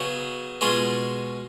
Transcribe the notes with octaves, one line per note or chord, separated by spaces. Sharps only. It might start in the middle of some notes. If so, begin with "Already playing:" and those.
Already playing: C#3 F#3 B3 D#4 G#4
B2 G#3 C#4 F4 G#4